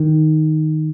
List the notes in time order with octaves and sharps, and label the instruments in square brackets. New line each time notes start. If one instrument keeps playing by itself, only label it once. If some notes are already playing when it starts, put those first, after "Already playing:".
Already playing: [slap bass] D#3